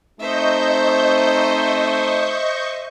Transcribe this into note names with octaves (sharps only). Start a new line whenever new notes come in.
A3 C4 D#4 C5 D#5 E5 C#6 G6